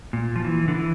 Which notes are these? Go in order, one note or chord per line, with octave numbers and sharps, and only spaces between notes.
A#2
F3
E3
D3
E3